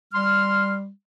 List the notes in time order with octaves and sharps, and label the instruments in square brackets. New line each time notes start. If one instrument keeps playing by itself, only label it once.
[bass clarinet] G3 [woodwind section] C6 F6